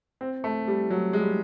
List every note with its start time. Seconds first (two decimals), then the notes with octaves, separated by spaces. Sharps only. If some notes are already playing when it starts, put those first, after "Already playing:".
0.21 C4
0.44 A3
0.67 G3
0.91 F#3
1.13 G#3
1.21 G3